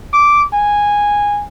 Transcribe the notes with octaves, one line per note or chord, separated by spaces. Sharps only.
D6
G#5